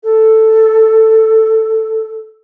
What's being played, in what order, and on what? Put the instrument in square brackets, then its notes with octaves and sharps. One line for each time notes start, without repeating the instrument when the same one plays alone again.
[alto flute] A4